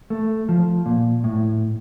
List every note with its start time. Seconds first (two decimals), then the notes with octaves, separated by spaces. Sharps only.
0.10 A3
0.49 F3
0.86 A#2
1.24 A2